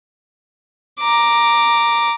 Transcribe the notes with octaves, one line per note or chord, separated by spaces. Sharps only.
A#5 D6